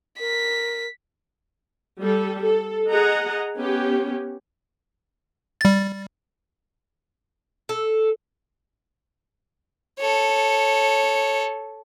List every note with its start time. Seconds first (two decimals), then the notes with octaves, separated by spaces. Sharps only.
0.20 A#4 B6
2.02 G3 A4
2.44 A4
2.91 G#4 D#5 F#5 A#5
3.57 B3 C#4 G4
5.61 G3 A6
7.69 A4
9.99 A4 C#5